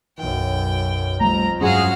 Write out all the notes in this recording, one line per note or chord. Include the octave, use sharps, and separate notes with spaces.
B1 F#2 G5
F2 G3 A3 A#5
G2 F#3 G#3 C#4 F#4 G#4 F5